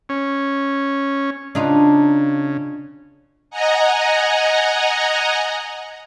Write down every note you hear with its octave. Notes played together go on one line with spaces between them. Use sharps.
C#4
C#3 D4 D#4 F4
D#5 F#5 G#5 A#5